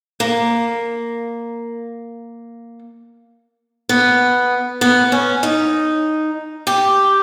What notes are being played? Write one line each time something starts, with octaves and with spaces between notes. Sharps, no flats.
A#3
B3
B3
C#4
D#4
G4